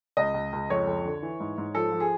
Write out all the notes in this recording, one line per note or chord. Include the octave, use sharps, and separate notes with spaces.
C#2 D#5
C#2
C#2
F2 C#5
F2
D3
E3
G#2
G#2
F3 A4
F3
G#4